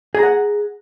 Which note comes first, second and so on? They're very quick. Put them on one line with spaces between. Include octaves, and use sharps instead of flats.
G#4 A#5 F#5